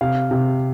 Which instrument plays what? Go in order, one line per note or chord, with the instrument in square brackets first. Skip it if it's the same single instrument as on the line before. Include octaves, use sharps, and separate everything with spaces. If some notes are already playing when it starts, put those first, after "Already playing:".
[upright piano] C3 F5
C3